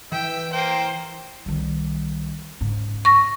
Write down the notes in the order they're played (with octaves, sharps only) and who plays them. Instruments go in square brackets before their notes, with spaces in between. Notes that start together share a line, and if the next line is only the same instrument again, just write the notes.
[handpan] E3 [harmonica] E5 [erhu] G5
[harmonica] A#3 G5 [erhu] C5
[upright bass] C2 D#3
G#2 C#3
[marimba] C#6 A#6